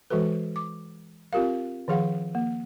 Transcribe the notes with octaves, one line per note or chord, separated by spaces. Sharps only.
E3 G#3 F#4 A4 B4
D6
C4 F4 G4 A#4 F5
D#3 F3 G#4 F5 F#5
A#3